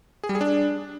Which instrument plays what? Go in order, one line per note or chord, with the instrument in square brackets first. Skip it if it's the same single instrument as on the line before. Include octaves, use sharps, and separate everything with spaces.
[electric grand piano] G#4
G3
G#4
D4